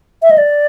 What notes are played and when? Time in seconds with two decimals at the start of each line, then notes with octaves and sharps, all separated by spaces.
0.22 E5
0.31 D#5
0.38 D5